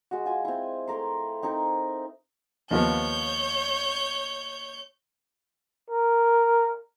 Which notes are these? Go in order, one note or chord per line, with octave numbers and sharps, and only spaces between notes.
G#3 F#4
F4 G#5
C4 E4
A3 A#4 C6
C4 D#4 E4 A#4
D#2 F3 B3 C#5 G6
A#4